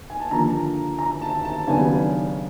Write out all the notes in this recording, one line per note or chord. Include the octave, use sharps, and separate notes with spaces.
G#5
A5
D#2 D3 F3 A#3 A#5
A#5
A5
A5
D#2 C#3 F#3 B3 D4 G#5